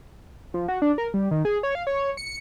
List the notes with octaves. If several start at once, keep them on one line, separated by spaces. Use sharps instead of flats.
F3
F#4
D4
A#4
G3
D#3
G#4
C#5
F5
C#5
C#7